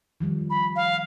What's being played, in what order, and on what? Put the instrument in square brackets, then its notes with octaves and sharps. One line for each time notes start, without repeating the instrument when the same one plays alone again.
[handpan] D#3 F3 G3
[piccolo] B5
F5